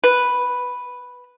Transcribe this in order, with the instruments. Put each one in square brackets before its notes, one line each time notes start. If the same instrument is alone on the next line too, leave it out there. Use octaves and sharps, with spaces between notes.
[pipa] B4